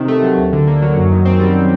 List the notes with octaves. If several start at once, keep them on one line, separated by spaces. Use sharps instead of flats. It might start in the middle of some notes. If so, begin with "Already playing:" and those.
Already playing: C3 D#3
A3
F#3
D2
D3
A#3
F#3
F#2
D#3
C4
G3